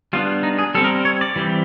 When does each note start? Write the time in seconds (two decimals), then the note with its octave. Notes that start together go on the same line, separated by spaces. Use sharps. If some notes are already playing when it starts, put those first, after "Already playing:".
0.13 G3 B3 D4 F4
0.43 D#4
0.59 G#4
0.75 G3 C4 A4
0.84 A#4
1.05 C#5
1.21 D5
1.36 E3 G3 C4